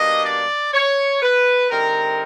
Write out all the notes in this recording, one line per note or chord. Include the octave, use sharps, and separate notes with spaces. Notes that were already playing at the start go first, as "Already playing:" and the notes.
Already playing: B2 G3 A#3 D4 D#5
D5
C#5
B4
D3 G3 C4 D#4 A#4